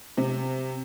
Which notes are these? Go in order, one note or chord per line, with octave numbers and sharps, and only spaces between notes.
C3